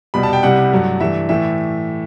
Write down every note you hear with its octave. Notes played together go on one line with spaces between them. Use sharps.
C2 B2 G3 B5
A5
G5
C2 C3 G3 F#5
G2 F#3 A3
G2 E3 A3 E5
A2 E3 A3 E5